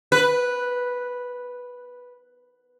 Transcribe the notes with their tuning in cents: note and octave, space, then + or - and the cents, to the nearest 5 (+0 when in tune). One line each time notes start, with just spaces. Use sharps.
B4 -5